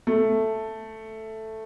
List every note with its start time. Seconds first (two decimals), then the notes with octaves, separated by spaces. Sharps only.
0.07 A3